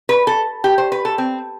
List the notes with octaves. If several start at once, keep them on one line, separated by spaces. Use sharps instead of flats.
B4
A4
G4
C5
B4
A4
C4